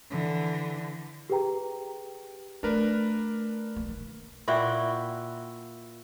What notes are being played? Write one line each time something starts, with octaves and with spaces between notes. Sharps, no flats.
D3 E3
G4 G#4 B4 G5 A#5
A3 D4 A#4 B4
B1 A#3
D#3
A#2 E4 F#4 G5